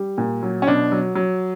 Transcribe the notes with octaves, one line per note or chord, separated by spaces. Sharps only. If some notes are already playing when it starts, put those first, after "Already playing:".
Already playing: G3
A#2
F#3
C#4
B2 D4
F#3
F#3